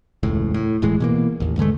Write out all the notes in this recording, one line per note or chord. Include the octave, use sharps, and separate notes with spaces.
E1 C#2 A2
A2
D1 A2 E3 G#3
B2 E3 A#3
A1 D#2
G2 D3 G#3 A3